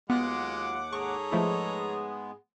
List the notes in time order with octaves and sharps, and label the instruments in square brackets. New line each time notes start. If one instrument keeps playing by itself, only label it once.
[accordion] D#2 F#5 D6 [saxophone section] F#3 F4 [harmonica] G#3 [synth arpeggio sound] B3
[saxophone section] G#2 G#4 [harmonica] A4 C#5 A#5 [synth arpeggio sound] C#6
[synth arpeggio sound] F3 A3 E4 [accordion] G#3 B3